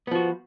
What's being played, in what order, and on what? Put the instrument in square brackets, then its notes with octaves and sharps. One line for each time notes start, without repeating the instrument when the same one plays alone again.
[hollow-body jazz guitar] B3
F3
F#4